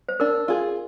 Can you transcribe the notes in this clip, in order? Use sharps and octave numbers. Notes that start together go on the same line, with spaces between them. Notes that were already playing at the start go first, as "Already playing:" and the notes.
C5
D4 A#4
F4 G#4